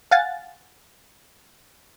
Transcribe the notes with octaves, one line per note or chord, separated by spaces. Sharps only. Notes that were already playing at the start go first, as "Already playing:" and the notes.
F5 F#5 G#5 A6